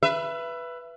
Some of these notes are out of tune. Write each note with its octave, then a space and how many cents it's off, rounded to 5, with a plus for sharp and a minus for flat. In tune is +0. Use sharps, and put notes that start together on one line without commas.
B4 +0 E5 +25